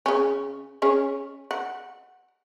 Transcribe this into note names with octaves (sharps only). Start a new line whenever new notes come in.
C#3 C#4
C#4 G#4 C#5
F#5